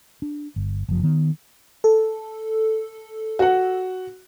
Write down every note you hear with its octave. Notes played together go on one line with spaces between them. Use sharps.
D4
G1
F#1 F3
D#3 B3
A4
F#4 F#5